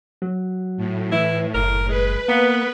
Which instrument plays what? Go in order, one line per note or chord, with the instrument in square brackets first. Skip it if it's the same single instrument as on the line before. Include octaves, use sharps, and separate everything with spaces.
[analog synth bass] F#3
[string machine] A2
[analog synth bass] E3 [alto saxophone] E4
[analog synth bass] F#1 [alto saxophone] A#4
[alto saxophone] G#3 [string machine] B4
[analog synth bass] A#3 [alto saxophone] B3